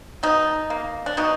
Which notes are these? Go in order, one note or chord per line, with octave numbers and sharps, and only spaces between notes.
B2 D#4
A#3
D4
B2 D#4